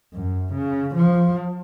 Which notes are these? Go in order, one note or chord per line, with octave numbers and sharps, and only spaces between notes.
F#2
C#3
F3